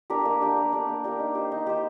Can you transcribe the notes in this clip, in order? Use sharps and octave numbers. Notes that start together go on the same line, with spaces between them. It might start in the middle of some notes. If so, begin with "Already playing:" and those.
D4 G4 A#4
A#3
D4 G4 A#4
A#3
D4 G4 A#4
A#3
D4 G4 A#4
D#4
G4 C5
D#4
G4 C5